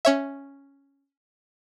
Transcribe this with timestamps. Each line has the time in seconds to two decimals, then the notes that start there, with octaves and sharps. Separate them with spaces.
0.05 C#4 C#5 E5